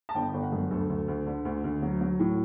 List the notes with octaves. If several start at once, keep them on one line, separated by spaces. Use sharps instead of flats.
A5
G1 G5
G1
F#5
F#2
D2 A4
D2
D2
D3
D2
D2
F#3
F#3
A2